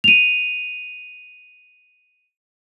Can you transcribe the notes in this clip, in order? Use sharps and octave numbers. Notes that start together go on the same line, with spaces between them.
D#7 F7